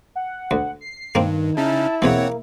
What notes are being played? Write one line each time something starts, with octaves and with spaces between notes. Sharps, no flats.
F#5
D2
C7
G2 D#3 A#3 C4
C#3 C#4 D#4 E4 A5
E2 B2 E3 A#3 C4 C#5 F#5